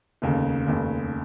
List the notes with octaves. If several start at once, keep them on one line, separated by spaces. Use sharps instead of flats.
F1 D#2 C#3
F1 D#2 C#3